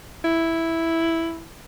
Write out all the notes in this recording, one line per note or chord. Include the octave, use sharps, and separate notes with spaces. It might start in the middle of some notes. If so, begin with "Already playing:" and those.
E4